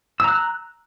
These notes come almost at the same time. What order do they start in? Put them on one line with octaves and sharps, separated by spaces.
E6 A#5 F#6